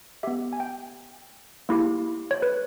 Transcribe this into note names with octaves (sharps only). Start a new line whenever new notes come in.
B3 G4 E5
G#5
G5
A#3 E4 G4
C#5
B4